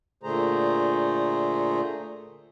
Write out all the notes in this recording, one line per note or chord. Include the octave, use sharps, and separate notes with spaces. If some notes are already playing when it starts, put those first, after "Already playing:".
A#2 D3 A3 G#4 C5 A#5